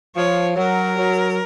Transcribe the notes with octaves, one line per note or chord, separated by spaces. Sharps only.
F3 C#5
F#3 A#4
F#3